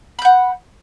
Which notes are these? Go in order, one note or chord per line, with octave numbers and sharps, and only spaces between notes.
F#5 B5 G6